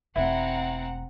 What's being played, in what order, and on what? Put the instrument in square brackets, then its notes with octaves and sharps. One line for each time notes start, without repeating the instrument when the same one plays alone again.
[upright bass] E1 A3 [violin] C4 [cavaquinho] E4 [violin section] F#5 A#5